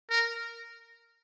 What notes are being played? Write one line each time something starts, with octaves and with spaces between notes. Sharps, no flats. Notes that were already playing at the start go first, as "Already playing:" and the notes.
A#4